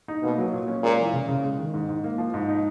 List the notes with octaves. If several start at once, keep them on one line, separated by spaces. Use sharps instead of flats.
D#4
B2 A#3
F#3
A#2
C#4
A#2 G#3
E3
C#3
C#3
G#3
D#3
G#2
G#2
A#3
F3
G#2
D#4